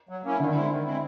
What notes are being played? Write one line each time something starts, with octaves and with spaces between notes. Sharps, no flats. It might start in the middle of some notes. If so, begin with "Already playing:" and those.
F#3
A#3 C#4 E4
D3 D#3
G#3 C4 E4
D#3
G#3 C4 E4